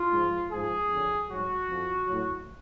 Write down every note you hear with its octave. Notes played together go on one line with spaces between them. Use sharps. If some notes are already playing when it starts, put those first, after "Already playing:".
Already playing: F4
G#2 F3
G#2 F3 G#4
F2 D3 F#3
G#2 F#3 F#4
F2 F3
A2 F#3